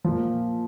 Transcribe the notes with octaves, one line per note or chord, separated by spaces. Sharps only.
A#2 F3